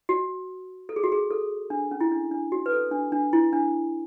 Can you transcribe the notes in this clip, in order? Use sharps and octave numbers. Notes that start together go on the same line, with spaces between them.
F#4
A4
G#4
F#4
G#4
A4
D4
C#4
E4
D4
D4
F#4
B4
A4
D4
D4
E4
D4